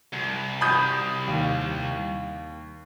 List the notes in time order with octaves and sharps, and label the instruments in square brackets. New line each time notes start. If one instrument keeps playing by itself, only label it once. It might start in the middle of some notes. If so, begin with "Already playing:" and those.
[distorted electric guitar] C2
[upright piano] B5 D#6 G6
D#2